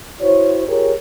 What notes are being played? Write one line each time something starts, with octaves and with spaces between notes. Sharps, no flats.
E4 F#4 C5 C#5
F4 G4 G#4 A#4 C#5